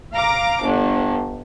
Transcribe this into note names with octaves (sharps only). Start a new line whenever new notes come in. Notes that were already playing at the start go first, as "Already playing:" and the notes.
F5 A#5 D6
G1 D4